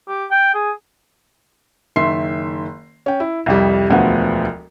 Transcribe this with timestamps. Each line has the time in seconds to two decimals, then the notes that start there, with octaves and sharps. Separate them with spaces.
0.08 G4
0.31 G5
0.54 G#4
1.96 F#1 D#3 E5 C6 C7
3.06 C#4 G5
3.20 E4
3.46 C2 F2 G3
3.90 E1 D2 F3 B3 F#4